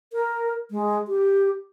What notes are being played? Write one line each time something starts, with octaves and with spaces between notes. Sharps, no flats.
A#4
G#3
G4